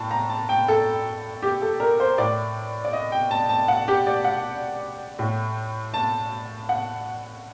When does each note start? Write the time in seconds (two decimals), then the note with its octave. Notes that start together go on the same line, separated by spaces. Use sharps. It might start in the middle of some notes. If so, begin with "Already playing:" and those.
Already playing: A2 G5 A5
0.11 A#5
0.30 A5
0.49 G5
0.68 A4
1.42 G4
1.62 A4
1.80 A#4
2.00 C5
2.18 A2 D5
2.85 D5
2.93 D#5
3.12 G5
3.31 A5
3.49 A5
3.68 F#5
3.88 G4
4.07 D5
4.24 F#5
5.19 A2
5.94 A5
6.69 F#5